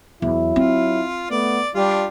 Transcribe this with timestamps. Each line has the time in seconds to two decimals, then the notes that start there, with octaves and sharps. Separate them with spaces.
0.22 E2 F#3 E4
0.56 C4 F4
1.30 A3 B3 D5
1.74 G3 D4 F4 G4